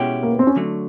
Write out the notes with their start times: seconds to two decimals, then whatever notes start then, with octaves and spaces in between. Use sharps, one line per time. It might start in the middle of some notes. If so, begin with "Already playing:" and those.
Already playing: B2 G#3 C#4 E4 G4
0.23 A#3
0.31 B3
0.39 C4
0.47 C#4
0.56 D3 F#3 A3